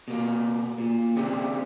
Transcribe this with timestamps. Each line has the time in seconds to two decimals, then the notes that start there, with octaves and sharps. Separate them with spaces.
0.08 B2 A#3
0.78 A#2
1.16 C#3 C4 D4 G4